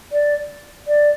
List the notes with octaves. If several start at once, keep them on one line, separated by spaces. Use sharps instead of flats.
D5
D5